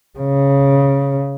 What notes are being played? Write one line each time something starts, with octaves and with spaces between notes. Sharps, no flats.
C#3